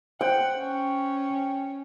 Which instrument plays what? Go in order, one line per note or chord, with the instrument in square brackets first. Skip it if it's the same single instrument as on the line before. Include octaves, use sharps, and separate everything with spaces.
[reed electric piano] C5 [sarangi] F#5 [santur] G5
[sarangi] C#4